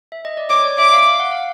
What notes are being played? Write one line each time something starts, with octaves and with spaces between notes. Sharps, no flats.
E5
D#5
D5
C#5 D6
D5
E5 D6
F5
F5
F#5
F5